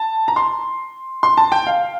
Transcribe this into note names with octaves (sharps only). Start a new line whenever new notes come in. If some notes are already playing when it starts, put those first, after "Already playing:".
Already playing: A5
A#5
C6
C6
A5
G5
F5